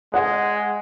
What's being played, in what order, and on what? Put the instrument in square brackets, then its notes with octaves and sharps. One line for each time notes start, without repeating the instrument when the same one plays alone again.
[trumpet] G#3 [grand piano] F#5